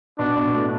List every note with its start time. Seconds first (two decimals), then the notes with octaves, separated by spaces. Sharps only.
0.19 B2 D4
0.37 B2
0.54 A2